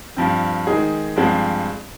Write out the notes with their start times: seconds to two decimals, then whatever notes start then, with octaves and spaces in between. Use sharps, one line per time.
0.17 G2 F3 C4
0.67 D#3 G#3 D#4 G#4
1.16 G2 F3 G#3 C4